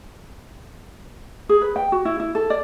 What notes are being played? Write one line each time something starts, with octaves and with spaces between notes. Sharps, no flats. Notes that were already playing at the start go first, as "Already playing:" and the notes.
G#4
B4
G5
F#4
E4
E4
A4
D5